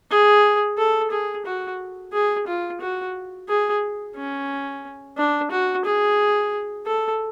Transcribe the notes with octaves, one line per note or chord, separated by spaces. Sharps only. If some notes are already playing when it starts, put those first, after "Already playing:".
G#4
A4
G#4
F#4
G#4
F4
F#4
G#4
C#4
D4
F#4
G#4
A4